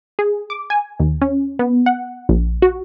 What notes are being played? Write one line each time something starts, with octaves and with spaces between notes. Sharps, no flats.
G#4
D6
G#5
D#2
C#4
B3
F#5
A#1
F#4